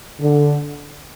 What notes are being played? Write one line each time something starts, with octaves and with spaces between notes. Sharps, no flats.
D3